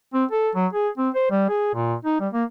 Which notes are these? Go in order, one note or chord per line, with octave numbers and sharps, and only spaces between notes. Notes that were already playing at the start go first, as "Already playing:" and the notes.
C4
A4
F#3
G#4
C4
C5
G3
G#4
A#2
D#4
G3
A#3